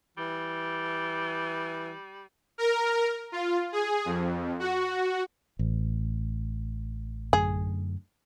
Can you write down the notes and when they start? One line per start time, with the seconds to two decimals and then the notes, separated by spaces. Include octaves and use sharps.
0.17 E3 G3
2.58 A#4
3.32 F4
3.72 G#4
4.05 F2
4.59 F#4
5.59 A1
7.33 F#2 D3 A3 G#4